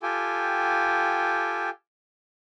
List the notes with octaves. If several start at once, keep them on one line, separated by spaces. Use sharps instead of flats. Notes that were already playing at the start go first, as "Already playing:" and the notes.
F4 G4 A4 G5 G#5